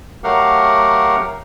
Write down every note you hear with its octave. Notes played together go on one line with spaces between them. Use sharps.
F#3 A3 G4 A#4 F5 F#5